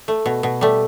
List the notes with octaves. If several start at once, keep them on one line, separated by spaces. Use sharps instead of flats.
A3
B2
B2
G3 A3